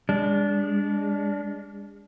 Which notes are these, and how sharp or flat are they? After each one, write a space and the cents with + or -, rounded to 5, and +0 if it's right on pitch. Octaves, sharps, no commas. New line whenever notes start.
G#3 -40 D4 -20